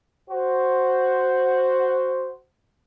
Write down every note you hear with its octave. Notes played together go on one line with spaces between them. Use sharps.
F#4 C5